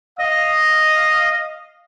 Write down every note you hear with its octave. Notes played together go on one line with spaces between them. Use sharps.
D#5 F5 D#6